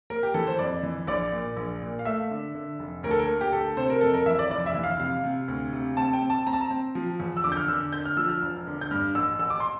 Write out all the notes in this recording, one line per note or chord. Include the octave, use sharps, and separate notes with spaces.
A#3 A#4
G4
E3 A4
C5
F2 D5
E3
A#1 D5
A#2
A#1
A#2
F5
A3 E5
D3
D3
F1
D2 A#4
A4
A#4
A#3
G4
D2 A4
C3 C5
A#4
F2 A4
A#4
E3 E5
D5
F1 D5
E5
E3
F5
C3 F5
C3
D2
C3
C4 A5
G5
C4
A5
C4 A#5
A5
A#5
C4
F3
E2
E6
D3 D6
G6
F6
D3 E6
D3 G6
F6
F3 E6
F6
E1
D3
G6
G2 F6
A1 E6
A1 E6
D6
C6